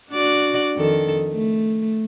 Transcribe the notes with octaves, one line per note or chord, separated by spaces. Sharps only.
D4 F#4 D5
F2 D#3 A4
A3